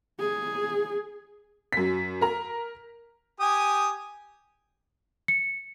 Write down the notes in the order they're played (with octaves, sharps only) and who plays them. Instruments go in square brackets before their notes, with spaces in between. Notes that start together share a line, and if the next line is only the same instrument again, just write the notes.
[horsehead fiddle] G#4
[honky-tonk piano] F#2 B6
A#4 A#5
[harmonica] G4 G#5 D#6
[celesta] C#7